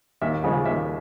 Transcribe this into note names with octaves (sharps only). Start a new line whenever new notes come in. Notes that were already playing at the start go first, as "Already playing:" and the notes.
D#2 E5
C#3 F3 G#3
D#2 E5